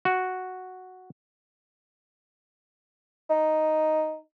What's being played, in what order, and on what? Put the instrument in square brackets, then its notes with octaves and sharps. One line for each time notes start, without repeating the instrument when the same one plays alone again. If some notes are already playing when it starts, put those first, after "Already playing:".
[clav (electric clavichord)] F#4
[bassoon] D#4